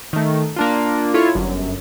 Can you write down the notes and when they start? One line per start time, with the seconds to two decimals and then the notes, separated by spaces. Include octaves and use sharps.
0.13 D#3 A3
0.56 A#3 D4 F4
1.14 E4 F4 A4 C#5
1.35 G1 F#2